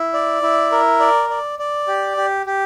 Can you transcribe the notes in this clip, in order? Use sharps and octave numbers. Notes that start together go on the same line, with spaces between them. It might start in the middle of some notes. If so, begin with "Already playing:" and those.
Already playing: E4
D5
E4
A#4
D5
D5
D5
G4
G4
G4